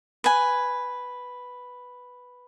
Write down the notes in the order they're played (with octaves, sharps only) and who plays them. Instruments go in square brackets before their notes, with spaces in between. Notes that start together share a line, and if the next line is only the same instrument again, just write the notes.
[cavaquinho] B4 G#5